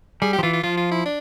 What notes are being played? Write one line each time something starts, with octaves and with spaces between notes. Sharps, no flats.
G3 G#4
G4
F3
E3 F4
F4
F3 F4
F4
E4
D4